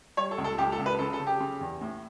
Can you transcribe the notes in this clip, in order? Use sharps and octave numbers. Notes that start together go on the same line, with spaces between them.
G3 C#5
A4
C#2
A4
C#2 G4
A4
C#2
B4
C#3 A4
A4
C#3
G4
C#3
E2
A2